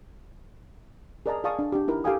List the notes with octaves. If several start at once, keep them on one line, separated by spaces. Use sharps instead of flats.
G#4 A#4 D5 D#5 A5 A#5
G#4 D5 F5 A5 C#6 D#6
D4
D4 G4
D#4 E4 A#4
G4 A4 F5 G5 G#5 D#6